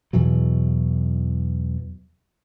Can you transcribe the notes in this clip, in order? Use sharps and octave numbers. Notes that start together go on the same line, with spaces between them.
E2 B2 E3 F#3